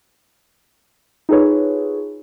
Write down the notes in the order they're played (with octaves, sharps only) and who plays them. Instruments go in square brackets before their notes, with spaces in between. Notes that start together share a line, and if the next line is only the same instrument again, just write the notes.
[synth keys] D#4 F4 G#4 A4 B4 C#5